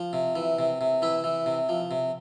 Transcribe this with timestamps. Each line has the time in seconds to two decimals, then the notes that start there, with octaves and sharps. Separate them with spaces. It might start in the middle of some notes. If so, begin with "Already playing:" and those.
Already playing: F3
0.13 C3
0.36 E3
0.59 C3
0.81 C3
1.02 E3 E4
1.24 E3
1.46 C3
1.69 F3
1.91 C3